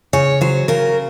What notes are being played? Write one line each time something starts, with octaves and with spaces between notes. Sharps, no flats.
C#3 C#5
F#3 C5
C#3 A#4